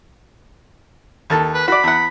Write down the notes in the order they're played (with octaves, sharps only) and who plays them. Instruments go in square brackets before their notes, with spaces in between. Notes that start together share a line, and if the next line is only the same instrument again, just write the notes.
[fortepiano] D#2 A4 A5
[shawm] B4
[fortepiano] F#4 D5 [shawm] B5
[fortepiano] E2 F#5